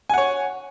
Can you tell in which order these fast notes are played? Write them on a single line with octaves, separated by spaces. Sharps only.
G#5 F#5 C#5